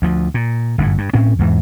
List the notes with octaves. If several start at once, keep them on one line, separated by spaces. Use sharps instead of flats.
D2 F3
A#2
G1 F#2 A2
G2
A2 C4 C#4
E2 G#2 E3